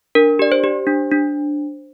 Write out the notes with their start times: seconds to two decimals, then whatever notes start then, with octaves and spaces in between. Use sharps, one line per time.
0.15 D4 A#4
0.39 G4 D5
0.52 C5
0.64 G4
0.87 D4
1.11 D4